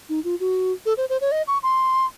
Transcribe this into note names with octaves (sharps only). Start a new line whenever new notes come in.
D#4
F4
F#4
A4
C5
C5
C#5
D#5
C#6
C6